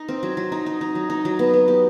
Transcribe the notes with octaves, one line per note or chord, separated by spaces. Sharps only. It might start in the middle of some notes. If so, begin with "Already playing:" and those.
Already playing: D#4
C4
F#3
F#3
D#4
D#4
D#4
F#3
D#4
F#3
B3
B3
G4